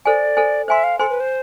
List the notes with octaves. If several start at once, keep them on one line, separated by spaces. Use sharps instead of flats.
A4 C5 D5 G#5
A4 C5 G#5
C5 E5 G#5 C6
F5
A4 C5 G#5 C6
B4
C5